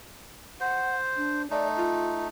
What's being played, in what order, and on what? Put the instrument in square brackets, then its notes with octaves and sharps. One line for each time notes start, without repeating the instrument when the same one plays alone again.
[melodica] C5 [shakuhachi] F#5
[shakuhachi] D4
[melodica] A3 D#4 [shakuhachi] D5
[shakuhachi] F4